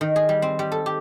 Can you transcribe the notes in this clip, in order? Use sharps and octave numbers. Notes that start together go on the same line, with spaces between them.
D#3
G#4
G3
C4
G3
A4
G4